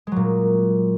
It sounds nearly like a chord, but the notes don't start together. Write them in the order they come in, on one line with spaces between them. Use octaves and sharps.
G#3 F#3 A#2